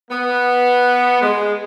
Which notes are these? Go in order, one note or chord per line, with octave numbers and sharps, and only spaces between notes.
B3
G#3